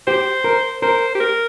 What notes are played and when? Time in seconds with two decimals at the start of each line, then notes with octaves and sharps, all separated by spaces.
0.07 G4 C5
0.44 A#4
0.82 A#4 C5
1.15 G4
1.20 A#4